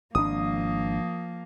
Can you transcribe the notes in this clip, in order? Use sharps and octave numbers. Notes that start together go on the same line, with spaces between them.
G#1 B2 F3 A#3 D4 D#6